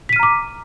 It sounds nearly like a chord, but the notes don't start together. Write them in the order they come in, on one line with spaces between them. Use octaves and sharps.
B6 D#7 F6 A#5 D6